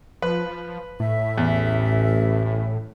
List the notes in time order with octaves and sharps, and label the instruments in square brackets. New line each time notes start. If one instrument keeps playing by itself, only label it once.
[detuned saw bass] F3 [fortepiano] B4
[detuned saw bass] A2 [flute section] E5
[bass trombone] A1 [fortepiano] E2